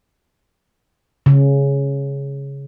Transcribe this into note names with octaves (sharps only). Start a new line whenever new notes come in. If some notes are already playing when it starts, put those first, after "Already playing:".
C#3